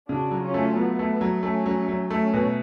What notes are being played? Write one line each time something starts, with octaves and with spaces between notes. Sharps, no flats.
C#3 D4 F#4
F#3
C#4 F4
A3
F#3 B3
A3
F#3
A3 C#4
F#3
F#3
A3 C#4
B2